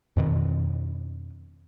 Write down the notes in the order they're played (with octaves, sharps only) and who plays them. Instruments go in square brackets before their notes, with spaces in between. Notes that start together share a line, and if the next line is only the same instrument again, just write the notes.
[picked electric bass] F2 B2 D#3